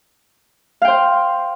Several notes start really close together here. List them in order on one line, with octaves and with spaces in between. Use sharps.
F5 G5 C5